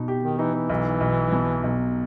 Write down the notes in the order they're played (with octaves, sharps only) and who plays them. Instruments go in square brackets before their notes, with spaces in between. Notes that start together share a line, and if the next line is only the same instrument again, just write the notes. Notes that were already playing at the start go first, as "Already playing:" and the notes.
Already playing: [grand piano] B2 D#4
G4
[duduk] D#3
[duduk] E3 [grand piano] D#4
[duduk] E3
[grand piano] B1
B1
B2
B1